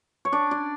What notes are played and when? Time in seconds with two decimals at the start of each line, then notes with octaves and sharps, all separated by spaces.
0.25 C#5
0.32 D4 D5
0.51 D4 D5